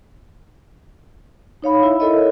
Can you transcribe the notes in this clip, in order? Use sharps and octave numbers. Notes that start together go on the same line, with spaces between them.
D#4 C#5 F5 B5
E4 E5
E4 A4 A#4 C#5 D#5